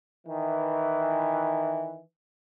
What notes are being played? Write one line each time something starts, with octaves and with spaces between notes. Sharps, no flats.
D#3 E3